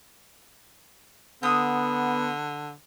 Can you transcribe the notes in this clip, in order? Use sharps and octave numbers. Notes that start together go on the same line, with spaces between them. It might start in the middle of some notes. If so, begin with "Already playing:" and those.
D3 B3 D#6